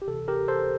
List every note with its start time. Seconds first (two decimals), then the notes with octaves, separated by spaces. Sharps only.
0.02 G4
0.08 D2 C3 E3 A4
0.28 G4 A#4
0.48 A4 C5